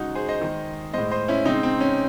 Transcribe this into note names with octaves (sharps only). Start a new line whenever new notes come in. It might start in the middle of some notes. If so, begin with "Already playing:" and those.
Already playing: C#3 G#3 D#4 F#4
G#4 C5
C5 D#5
D#3 G#3
A2 G#3 C5 D#5
C5 D#5
C#4 E4
C#3 G#3 C4 D#4
C4
C#4